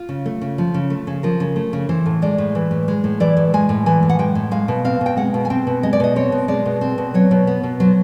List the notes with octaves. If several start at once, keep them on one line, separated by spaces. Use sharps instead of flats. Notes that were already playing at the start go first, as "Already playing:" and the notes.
Already playing: F4
C#3
A3
C#3
F3
C#3
A3
C#3
F3 A#4
C#3
A3
C#3
E3 C5
A2
G#3 D5
A2
E3
A2
G#3
A2
E3 D5
A2
G#3 G#5
A2
E3 G#5
A2
F#5
G#3 G5
A2
G#3 F5
B2
C4 F5
B2
G5
G#3 F#5
B2
G#5
C4 G5
B2
G#3 D#5
D5
B2 D#5
C4 C#5
B2
G#3 D5
B2
C4
B2
F#3 C#5
B2
B3
B2
F#3 C5